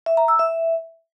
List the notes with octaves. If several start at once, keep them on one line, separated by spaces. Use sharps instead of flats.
E5
A#5
E6
E5